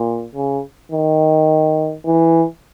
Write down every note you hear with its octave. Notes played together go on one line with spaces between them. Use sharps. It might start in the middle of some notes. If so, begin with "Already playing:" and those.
Already playing: A#2
C#3
D#3
E3